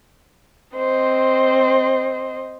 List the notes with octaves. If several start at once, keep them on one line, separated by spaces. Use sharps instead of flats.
C4 C5 D#5